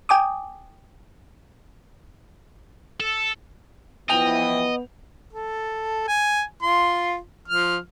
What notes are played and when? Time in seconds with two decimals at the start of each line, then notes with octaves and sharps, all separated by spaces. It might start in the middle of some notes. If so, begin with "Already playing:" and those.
0.09 G5 G#5 D6 D#6
3.00 A4
4.10 E3 F3 B3 D#5 G5 F7
5.33 A4
6.08 G#5
6.62 F4 C6
7.48 F3 F6